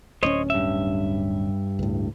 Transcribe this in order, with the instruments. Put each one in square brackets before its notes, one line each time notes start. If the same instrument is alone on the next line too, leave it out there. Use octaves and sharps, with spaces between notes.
[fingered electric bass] D1 C4 C#4 [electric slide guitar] C5 C#5 D#5
[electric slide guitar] G2 E5
[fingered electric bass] C#2 A2